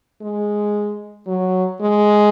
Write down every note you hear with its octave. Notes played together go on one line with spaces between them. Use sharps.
G#3
F#3
G#3